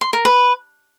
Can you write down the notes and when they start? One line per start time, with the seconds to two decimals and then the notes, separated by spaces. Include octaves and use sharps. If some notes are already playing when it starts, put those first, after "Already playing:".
0.01 C6
0.13 A#4
0.25 B4